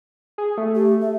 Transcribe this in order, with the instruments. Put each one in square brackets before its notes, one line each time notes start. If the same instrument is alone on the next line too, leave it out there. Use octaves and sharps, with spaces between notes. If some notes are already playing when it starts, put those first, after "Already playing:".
[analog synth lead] G#4
A3
[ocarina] G4
E5